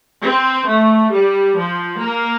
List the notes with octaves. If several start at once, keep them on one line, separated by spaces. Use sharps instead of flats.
C4
A3
G3
F3
A#3